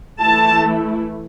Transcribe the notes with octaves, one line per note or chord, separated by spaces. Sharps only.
E3 A3 E4 A5